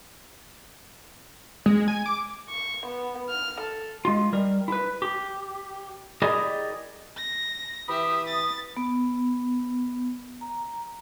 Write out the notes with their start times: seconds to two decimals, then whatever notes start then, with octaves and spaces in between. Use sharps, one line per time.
1.66 G#3
1.88 G#5
2.06 D6
2.49 C#6
2.86 B3
3.29 F6
3.61 A4
4.05 G#3 F4
4.33 G3 A#4
4.68 E4 B4
5.02 G4
6.22 E4 G4 G#4 A#4 D5 D#5
7.17 A#6
7.89 E3 G4 E5 B5 D#6
8.27 A6
8.77 B3
10.41 A#5